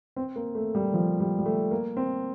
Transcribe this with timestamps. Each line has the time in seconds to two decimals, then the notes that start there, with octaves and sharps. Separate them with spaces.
0.16 C4
0.36 A#3
0.55 A3
0.75 G3
0.94 F3
1.20 G3
1.39 G3
1.46 A3
1.71 A#3
1.97 C4